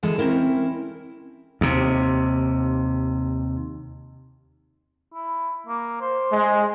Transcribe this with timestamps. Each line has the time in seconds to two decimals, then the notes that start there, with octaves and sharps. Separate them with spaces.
0.03 D2 D3 E3 G#3 G#4 A4
0.18 C4 C#4 E4 A#4
1.61 D#2 C3
5.14 E4
5.67 A#3
6.01 C5
6.31 G#3